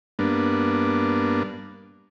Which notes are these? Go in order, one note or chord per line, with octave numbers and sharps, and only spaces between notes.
G2 A#3 B3 D4